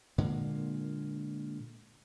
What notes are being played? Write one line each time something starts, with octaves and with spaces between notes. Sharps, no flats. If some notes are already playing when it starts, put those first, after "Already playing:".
A#2 D3 G#3 A#3